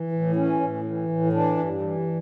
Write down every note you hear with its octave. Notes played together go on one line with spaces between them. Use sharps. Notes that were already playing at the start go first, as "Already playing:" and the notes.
Already playing: E3
A2
E3 C#4
A2
E3
A2
E3 D4
G2
E3